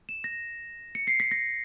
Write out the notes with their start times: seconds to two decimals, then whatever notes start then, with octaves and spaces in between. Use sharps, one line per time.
0.09 E7
0.24 A#6
0.95 C#7
1.07 C7
1.20 B6
1.31 A#6